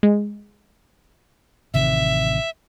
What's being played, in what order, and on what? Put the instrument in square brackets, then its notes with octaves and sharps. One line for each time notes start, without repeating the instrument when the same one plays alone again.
[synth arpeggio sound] G#3
[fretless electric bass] A1 C3 D#3 [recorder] E5